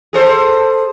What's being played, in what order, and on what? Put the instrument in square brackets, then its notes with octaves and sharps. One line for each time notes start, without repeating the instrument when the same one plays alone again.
[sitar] G#4 A4 C5